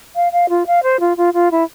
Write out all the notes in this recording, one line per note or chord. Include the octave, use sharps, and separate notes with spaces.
F5
F5
F4
F5
C5
F4
F4
F4
E4